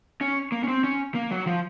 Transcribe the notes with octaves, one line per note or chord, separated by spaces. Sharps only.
C#4
A#3
C#4
C4
C#4
A#3
F#3
F3